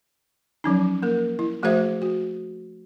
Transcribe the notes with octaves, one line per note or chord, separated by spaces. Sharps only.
F3 F#3 C#4 D#4
A#3 A#4
E4
F3 A3 F#4 G#4 C5 E5
F#4